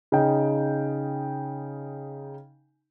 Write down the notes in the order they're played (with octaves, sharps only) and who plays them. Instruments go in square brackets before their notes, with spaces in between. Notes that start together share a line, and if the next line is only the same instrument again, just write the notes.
[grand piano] C#3 D#4 G5